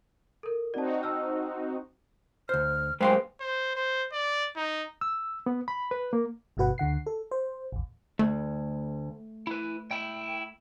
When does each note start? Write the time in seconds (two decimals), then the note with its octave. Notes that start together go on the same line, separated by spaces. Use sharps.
0.43 A4 A#4
0.74 C4 D#4 F#4 D5 A5
1.03 A5 E6 F6
2.49 D2 C5 F6
3.01 F#2 G#3 B4 C5 F5 G5 C6
3.40 C5
3.76 C5
4.13 D5
4.57 D#4
5.01 E6
5.46 B3
5.68 B5
5.91 B4
6.13 A#3
6.57 G1 G2 B2 F#4 B4 F#5
6.78 D2 D3 F#5 C7
7.06 A4
7.31 C5
7.72 A1 D#2
8.19 D2 A3
9.47 E4 B4
9.91 E4 G5